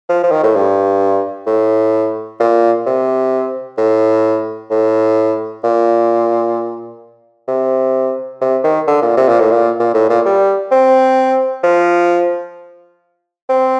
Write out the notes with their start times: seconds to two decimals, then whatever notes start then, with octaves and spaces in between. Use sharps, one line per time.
0.09 F3
0.23 F3
0.31 D#3
0.43 A2
0.55 G2
1.46 A2
2.40 A#2
2.86 C3
3.78 A2
4.70 A2
5.64 A#2
7.48 C3
8.41 C3
8.64 D#3
8.87 D3
9.02 A#2
9.17 C3
9.28 A#2
9.40 A2
9.51 A#2
9.79 A#2
9.94 A2
10.09 A#2
10.25 G3
10.71 C4
11.63 F3
13.49 C4